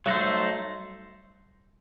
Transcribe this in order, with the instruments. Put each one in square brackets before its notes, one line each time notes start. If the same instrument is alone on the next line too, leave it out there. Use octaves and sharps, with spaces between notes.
[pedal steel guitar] F#3 A3 D#4 A4 C5 [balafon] G3